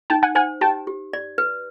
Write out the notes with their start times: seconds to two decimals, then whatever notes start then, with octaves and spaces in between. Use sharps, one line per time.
0.10 D#4 G5 A5
0.23 F#5 G#5
0.35 C5 F#5 G#5
0.61 G4 G5 A5
0.87 G4
1.13 D5
1.38 B4